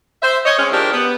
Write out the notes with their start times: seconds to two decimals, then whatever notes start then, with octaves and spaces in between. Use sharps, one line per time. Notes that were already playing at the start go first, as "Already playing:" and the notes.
0.22 C5 E5
0.46 C#5 D#5
0.58 G#3 C4 C#4
0.71 D#3 F3 D4 G4 G#4 A#4
0.92 B3